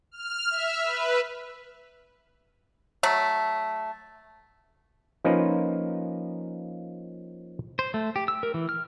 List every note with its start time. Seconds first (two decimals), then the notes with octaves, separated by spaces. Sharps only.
0.11 F6
0.51 E5
0.83 B4
3.03 F#3 A3
5.24 F3 A#3 C#4 D#4 F4 B4
7.79 C5
7.94 A3
8.16 G4
8.28 E6
8.43 A#4
8.54 E3
8.69 F6